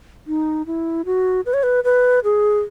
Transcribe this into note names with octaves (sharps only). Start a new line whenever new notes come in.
D#4
E4
F#4
B4
C#5
B4
B4
G#4